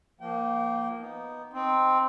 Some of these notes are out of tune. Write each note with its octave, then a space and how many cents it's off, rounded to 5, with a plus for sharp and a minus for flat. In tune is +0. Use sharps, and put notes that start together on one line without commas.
F3 -15 A#3 +0 G5 -30
B3 +0 D#4 +0
C4 +0 D#4 +0